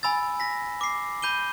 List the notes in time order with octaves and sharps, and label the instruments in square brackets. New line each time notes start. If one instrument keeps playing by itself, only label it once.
[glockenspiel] G#5 B5 E6 A6
A#6 B6
D6 C7
B5 G6 D#7 G7